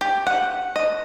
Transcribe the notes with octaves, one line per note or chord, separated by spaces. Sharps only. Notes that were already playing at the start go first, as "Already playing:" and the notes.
G4
F#5
D#5